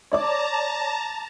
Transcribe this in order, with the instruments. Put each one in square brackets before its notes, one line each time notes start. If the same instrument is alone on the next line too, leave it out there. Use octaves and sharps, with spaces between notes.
[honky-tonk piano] C#5 D5 D6 [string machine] A5 A#5